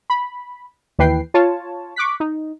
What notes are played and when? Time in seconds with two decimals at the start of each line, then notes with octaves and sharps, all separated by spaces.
0.10 B5
0.99 D#2 E3 B4 G5 C7
1.34 F4 C#5 A5
1.96 C#6 D6 F#6 B6
2.20 D#4